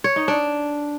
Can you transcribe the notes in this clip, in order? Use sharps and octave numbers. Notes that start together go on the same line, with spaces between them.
C#5
D#4
D4